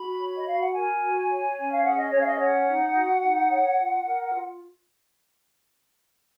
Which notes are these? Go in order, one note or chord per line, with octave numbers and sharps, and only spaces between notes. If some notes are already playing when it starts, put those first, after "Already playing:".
Already playing: F#4 B5
C#5
D#5
F#4 F5
F#5
A#4 G#5
F#4
C#5
C#4
F5
G#4 F#5
D#5
C#4 C#5
F5
D#5
C#5 F#5
D#4
F#4
D#4
C#5
F4
A#4
F4